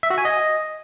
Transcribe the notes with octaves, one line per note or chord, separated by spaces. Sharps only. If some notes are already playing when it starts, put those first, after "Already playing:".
E5
F#4
G#5
D#5